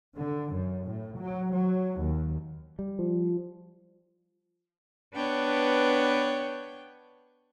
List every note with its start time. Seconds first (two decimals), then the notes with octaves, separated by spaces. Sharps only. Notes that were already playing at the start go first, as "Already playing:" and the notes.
0.17 D3
0.54 F#2
0.87 A2
1.18 F#3
1.54 F#3
2.01 D#2
2.79 G3
2.99 F3
5.14 B3 D4 B4 C#5 G5